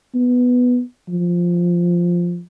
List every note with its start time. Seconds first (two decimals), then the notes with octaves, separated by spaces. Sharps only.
0.15 B3
1.09 F3